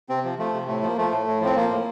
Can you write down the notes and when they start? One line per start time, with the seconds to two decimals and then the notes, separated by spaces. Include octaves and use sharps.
0.09 C3 C4
0.24 F3
0.38 F3 A3
0.54 C3
0.67 A2 A3
0.82 F3
0.88 A#3
0.98 F3 A3
1.11 A2
1.27 A2
1.41 F3 C4
1.56 F3 A#3
1.70 A2